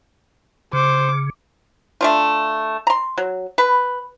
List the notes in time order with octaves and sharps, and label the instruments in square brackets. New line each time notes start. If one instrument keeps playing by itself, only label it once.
[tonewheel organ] C#3 [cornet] C5 [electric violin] D6
[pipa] A3 D4 F4
A#5 C6
F#3
B4